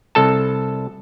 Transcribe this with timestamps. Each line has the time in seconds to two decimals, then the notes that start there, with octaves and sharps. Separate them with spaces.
0.15 C2 A4 A5